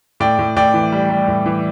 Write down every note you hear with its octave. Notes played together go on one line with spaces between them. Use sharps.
A2 D5 G5
A2
A2 D5 G5
E3
G3
G3
A2
E3